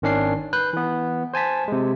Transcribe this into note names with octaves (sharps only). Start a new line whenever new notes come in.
G#1 D#3 C#4 D4 C7
B4 F#6 G6
E3 B3
C5 G#5 A5 B6
C3 G#3